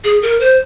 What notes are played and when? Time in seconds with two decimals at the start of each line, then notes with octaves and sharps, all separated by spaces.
0.04 G#4
0.22 A#4
0.40 C5